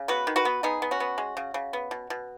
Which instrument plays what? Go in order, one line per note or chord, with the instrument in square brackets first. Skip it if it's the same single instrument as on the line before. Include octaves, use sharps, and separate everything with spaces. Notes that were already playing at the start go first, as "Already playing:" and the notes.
Already playing: [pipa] C#3
B3 F#4 B4
D#3
F#4 B4
B3
B3 D#4 G#4
B3
C#4 F#4
B3
G#3
C#3
C#3
B3
B2
B2